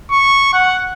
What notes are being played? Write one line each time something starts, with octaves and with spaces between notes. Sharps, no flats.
C#6
F#5